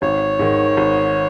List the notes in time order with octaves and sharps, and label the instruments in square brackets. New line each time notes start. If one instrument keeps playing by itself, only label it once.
[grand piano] G#1 [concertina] C#5
[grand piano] G#2 D#3
G#1